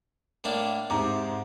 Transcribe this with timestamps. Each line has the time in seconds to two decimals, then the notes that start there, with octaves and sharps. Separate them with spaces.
0.44 A2 A#3 D4
0.90 G#2 C3 A#5 D6